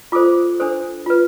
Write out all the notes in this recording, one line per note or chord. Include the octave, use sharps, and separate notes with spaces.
F4 A4 C5 D6
D4 A4 C5
F4 B4